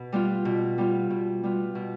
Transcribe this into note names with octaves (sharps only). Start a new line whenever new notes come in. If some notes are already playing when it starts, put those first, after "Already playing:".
Already playing: B2
G3 B3 F4
B2
G3 B3 F4
B2
G3 B3 F4
B2